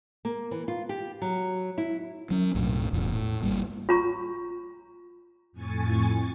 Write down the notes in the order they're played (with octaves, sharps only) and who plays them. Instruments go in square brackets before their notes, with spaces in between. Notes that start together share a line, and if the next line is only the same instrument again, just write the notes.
[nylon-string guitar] A#3
E3
F4
G4
F#3
E4
[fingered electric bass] F#3 C#4
B1 F#2 A2
E1 E2 A2
A2
G#1 G3 A#3
[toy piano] F4 A#5 C#6
[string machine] F2 A2 G#5 C#6 A6